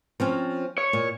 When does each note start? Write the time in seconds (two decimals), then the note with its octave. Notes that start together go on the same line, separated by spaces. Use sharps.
0.20 F3 C4 C#4
0.78 C#5
0.93 A#2